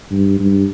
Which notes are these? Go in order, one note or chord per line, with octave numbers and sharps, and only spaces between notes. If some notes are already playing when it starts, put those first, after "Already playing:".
G2
G2